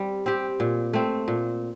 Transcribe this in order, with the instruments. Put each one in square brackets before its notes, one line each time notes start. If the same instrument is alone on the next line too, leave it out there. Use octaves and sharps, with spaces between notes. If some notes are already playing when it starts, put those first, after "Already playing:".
Already playing: [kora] G3 C4
C4 G4
A#2
A3 C4
A#2